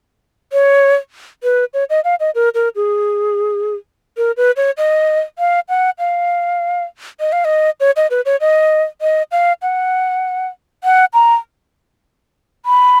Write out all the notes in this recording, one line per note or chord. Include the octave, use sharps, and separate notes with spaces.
C#5
B4
C#5
D#5
F5
D#5
A#4
A#4
G#4
A#4
B4
C#5
D#5
F5
F#5
F5
D#5
F5
D#5
C#5
D#5
B4
C#5
D#5
D#5
F5
F#5
F#5
A#5
B5